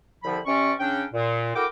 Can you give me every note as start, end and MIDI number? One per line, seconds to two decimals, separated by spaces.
0.24 0.38 36
0.24 0.38 50
0.24 0.38 53
0.24 0.38 83
0.46 0.72 48
0.46 0.72 61
0.46 0.72 74
0.46 0.72 85
0.80 1.05 49
0.80 1.05 61
0.80 1.05 62
0.80 1.05 79
1.13 1.55 46
1.55 1.65 64
1.55 1.65 66
1.55 1.65 69
1.55 1.65 70
1.55 1.65 79
1.55 1.65 86